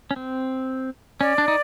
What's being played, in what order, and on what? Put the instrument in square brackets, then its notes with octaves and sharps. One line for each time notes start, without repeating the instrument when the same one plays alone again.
[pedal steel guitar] C#4
C4
[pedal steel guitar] C#4 [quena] D5
[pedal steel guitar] D4
D#4